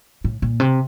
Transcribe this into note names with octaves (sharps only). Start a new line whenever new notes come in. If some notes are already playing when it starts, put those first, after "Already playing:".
A2
A#2
C3